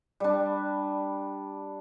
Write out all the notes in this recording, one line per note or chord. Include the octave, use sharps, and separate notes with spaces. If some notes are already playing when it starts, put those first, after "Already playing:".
G3 D4